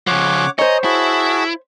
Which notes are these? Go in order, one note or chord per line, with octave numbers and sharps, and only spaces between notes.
C#3 F3 C#5 F#5 D6
C5 C#5 D#5 G#5 A#5
E4 F#4 G#4 A5